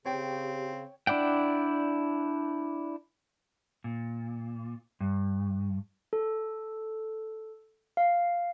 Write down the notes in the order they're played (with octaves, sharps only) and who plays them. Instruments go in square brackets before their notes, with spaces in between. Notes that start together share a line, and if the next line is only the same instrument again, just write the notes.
[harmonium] C#3 [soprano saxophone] C4 [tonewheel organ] G4 [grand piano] C#5 G5
[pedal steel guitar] D4 E4 D5 F#5 G5
[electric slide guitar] A#2
G2
[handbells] A4
F5